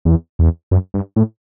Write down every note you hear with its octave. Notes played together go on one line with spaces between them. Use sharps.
E2
E2
F#2
G2
A2